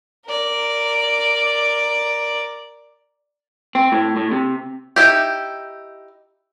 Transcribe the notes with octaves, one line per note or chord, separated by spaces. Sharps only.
A#4 D5
C4
A2
A2
C3
D#4 E4 G4